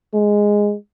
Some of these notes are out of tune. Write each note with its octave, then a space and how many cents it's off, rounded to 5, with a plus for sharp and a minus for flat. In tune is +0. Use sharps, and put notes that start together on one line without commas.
G#3 -5